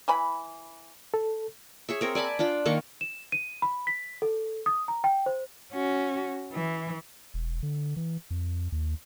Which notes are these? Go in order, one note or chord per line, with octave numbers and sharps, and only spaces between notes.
E3 G#5 B5
A4
G#4 C#5 E5
C4 A#4 C#5
D5 G#5 A5 B5
D4 F4 D5 G5
D#3 A#3 F5 C#6
E7
D#7
B5
B6
A4
D#6
A#5
G5
C5
C#4 F#4
E3
E1
D3
E3
F2
D#2